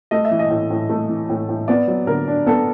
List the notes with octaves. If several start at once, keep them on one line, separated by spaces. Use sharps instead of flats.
A3 D#5
E5
E3
D#5
A2
A2
A3
E3
A2
A2
B3 D5
F#3
D3 A#4
D4
B3 A4